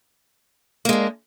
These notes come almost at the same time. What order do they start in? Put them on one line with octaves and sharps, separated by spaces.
A#3 G#3 D4